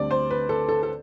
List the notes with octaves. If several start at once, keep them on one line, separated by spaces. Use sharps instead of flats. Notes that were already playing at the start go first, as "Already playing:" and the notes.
Already playing: D2 D3 G3 C4 D5
C5
B4
A4
A4
A4